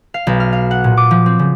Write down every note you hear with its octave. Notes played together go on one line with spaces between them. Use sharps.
F5
B1
F6
F5
F#5
A#2
D6
F3
C4
C#3